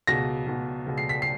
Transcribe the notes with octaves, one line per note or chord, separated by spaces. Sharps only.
C#2 B2 A#6
C#2 B2
C#2 B2
C7
B6
C7